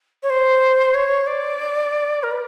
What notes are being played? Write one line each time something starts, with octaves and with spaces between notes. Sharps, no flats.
C#5
C5
C#5
D5
A#4
B4